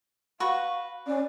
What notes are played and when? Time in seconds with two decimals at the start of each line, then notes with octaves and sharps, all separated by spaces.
0.40 F#4 B4 F5 C#6
1.07 C#4 D5